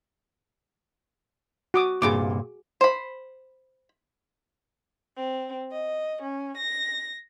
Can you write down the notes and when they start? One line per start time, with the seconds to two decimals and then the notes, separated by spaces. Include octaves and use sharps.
1.74 F#4 D6 D#6
2.02 C2 G2 A#2 G#4 D6
2.81 C5 B5
5.16 C4
5.71 D#5
6.21 C#4
6.56 A#6